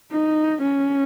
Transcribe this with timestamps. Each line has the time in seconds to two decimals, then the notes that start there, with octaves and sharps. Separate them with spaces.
0.12 D#4
0.61 C#4